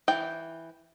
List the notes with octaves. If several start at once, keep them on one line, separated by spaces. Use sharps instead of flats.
E3 G5